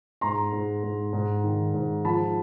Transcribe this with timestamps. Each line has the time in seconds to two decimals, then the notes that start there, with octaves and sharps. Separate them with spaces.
0.21 G#2 A#5 C6
0.52 G#2
0.83 G#2
1.13 G#2
1.44 D#3
1.74 G#2
2.05 F3 A5 B5